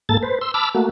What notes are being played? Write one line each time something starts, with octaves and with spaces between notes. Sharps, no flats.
G#2 A#3 A4 A5 A6
B4 C5
C6 E6
A5 B5 D6 E6 F6
A3 A#3 F#4